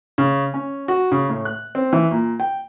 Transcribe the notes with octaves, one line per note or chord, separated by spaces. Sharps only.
C#3
C#4
F#4
C#3
A2
F#6
C4
E3
A#2
G5